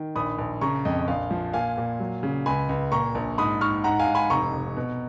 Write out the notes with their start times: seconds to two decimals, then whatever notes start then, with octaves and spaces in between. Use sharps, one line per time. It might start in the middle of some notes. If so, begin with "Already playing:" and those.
Already playing: D#3
0.16 A#1 B5 D#6
0.38 A#1
0.61 C#3 A#5 C#6
0.85 F2 D#5
1.07 A#1 F5
1.31 F3
1.53 A#2 F5 G#5
1.77 A#2
2.00 F#3
2.23 C#3
2.46 C#2 G#5 B5
2.69 C#2
2.92 A#2 A#5 C#6
3.15 A#1
3.38 G#2 B5 D#6
3.61 G#2 C#6 F6
3.84 G#2 F#5 A#5
3.99 F5 G#5
4.07 G#2
4.15 G#5 B5
4.30 F1 A#5 C#6
4.53 F1
4.76 B2